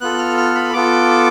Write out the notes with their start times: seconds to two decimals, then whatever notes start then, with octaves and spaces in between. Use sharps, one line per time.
0.01 B3 F4 A4 F#6
0.19 F6
0.37 F6
0.55 B5
0.73 B3 F4 A4 D6